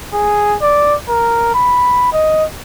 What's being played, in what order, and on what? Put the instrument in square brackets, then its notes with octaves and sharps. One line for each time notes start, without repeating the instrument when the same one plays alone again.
[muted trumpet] G#4
D5
A#4
B5
D#5